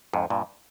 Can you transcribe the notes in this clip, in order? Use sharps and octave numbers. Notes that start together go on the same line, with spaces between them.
F2 G#2
G2 A#2